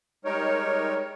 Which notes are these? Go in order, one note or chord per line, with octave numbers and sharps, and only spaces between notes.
G3 G#3 D#4 A#4 C#5